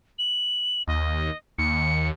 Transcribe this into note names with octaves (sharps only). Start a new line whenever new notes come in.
F#7
D#2 D#5
D#2 C#7